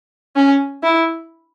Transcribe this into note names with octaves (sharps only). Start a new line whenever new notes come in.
C#4
E4